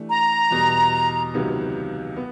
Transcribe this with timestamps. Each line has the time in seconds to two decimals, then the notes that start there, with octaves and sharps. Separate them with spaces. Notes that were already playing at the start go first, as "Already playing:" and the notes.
Already playing: E3 A3 D4 G4
0.09 A#5
0.51 E2 B2 G3
1.34 C#2 C3 D#3 F#3 B3
2.16 B3